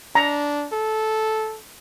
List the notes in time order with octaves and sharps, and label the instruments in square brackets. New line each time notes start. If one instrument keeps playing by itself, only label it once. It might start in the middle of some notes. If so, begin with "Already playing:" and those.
[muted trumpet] D4 [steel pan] A#5
[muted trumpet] A4